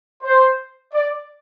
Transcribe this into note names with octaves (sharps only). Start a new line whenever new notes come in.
C5
D5